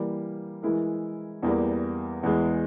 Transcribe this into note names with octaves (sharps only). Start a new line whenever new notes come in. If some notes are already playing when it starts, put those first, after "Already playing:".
Already playing: E3 G3 A#3
E3 G#3 E4 A#4
E2 E3 G3 A#3
E2 E3 G#3